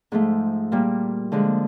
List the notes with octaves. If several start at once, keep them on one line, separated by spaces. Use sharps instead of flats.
G#2 F3 A3
A#2 G3 A#3
D3 F3 G#3